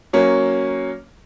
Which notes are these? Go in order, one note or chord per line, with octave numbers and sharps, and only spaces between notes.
F#3 A#3 C#4